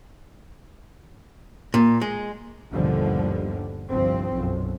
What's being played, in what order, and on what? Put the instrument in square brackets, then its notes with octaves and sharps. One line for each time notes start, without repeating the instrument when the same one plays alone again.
[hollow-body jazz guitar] A#2
G#3
[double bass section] G1 D#2 B2 D3 F3 G3
G1 C2 F3 C4
B1 F#2